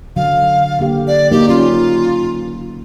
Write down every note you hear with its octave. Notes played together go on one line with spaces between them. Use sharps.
D3 F#3 F5
D3 A#3 G4
D5
F#3 A#3 D#4 G4
C#4 F4